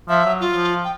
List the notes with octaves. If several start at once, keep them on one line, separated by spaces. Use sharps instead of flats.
F3 E5
F#3
F4
F3
G5